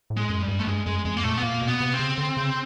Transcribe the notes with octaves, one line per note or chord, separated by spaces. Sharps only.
A2
G#3
F#2
G3
G2
A3
G2 G#3
F#2 G#3
F2 G#3
A#3
A#2 A3
B3
A#2 A#3
B2
B3
C3
C4
C#3
D3
C#3